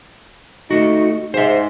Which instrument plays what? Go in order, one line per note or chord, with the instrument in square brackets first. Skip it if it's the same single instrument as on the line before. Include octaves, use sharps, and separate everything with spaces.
[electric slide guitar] A3 F#4 [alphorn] D#4
[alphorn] G#2 [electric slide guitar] C5 E5